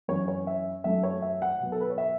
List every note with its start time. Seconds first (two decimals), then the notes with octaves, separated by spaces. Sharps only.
0.08 F#2 E3 C#4 C#5
0.28 C#5
0.47 E5
0.84 F#2 F#3 A3 C#4 E5
1.03 C#5
1.22 E5
1.42 F#5
1.60 B2 F#3 B3
1.72 A4
1.81 B4
1.90 C#5
1.98 E5